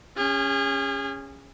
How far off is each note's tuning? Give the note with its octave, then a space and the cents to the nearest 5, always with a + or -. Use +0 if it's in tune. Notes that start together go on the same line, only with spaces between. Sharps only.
C#4 +0 G#4 -35